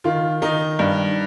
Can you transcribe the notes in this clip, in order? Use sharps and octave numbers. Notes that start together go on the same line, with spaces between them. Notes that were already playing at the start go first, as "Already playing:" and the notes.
D#3 F4
D#3 D#4
G2